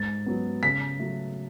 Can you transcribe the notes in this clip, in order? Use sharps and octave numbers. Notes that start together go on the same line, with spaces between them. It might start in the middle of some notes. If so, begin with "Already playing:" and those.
Already playing: G#2 A6
F#3 B3
C#3 B6
F#3 A3